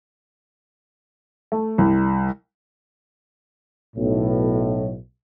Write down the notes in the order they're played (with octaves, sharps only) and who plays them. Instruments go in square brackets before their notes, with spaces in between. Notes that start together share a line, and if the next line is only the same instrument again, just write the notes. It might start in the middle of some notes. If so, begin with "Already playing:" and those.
[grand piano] A3
C2
[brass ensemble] B1 A2